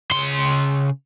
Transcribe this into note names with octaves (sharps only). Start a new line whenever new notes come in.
C#3 C6